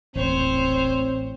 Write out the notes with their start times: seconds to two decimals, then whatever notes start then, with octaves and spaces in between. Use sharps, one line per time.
0.16 D#1 A1 C4 C5 C#5